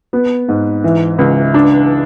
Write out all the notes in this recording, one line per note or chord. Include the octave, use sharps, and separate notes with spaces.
B3
G#2
E3
C#2
D4